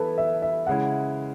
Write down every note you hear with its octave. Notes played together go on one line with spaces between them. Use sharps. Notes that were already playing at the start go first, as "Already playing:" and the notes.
Already playing: E3 B3 E4 A4 B4
E5
E5
C#3 G#3 C#4 E4 F#5